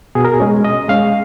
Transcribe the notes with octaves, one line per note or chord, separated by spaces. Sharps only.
B2 G#4
A#4
G#4
G#3 C#4
B2 D#5
G#3 C#4 F5